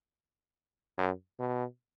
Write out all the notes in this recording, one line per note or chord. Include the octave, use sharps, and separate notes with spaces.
F#2
B2